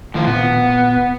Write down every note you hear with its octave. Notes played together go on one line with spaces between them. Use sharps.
A2 D#3 F3 A#3
A#2 B3